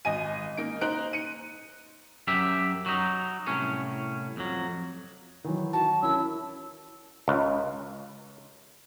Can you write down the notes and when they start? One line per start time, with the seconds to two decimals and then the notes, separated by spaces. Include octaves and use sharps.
0.05 G#1 D#5 G#5 D#7
0.57 A#3 D#4 D7
0.81 D#4 C5 A#5 F#6 D7
1.13 C#7 D#7
2.27 F#2 F#3 G4 E5
2.86 F#3 D#4
3.47 C2 A2 C#4
4.37 F2 F#3
5.44 D#3 E3 F#3
5.73 F#4 A5
6.03 C#4 E4 A#4 E6
7.28 C#2